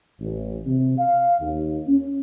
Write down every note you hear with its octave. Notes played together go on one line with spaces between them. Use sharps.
A1
C3
F5
D#2
C#4